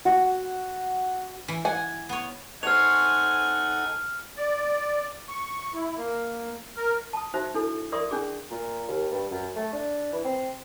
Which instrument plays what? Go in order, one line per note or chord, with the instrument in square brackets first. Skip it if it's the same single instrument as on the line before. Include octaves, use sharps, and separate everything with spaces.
[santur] F#4
[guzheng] E3
[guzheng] F#5 [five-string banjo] G#5
[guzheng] B3 C#5
[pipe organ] D#4 A4 F#5 [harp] C5 C#5 [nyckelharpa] G#5 [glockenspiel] F6 F7
[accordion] D5
C#6
E4
A#3
A#4
[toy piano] A5 D#6
D#4 F#4 C5 E5
D4 E4 A4
A#4 D5 E5 C6 C#6 D#6
C#4 D4 G#4 D6
[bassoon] A#2
D#2
G2
F#2
A3
D4
E3
C4